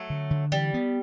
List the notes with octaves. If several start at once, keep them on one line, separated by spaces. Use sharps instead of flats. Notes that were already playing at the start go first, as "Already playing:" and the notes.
Already playing: F#3 A3
D3
D3
E3 G3
B3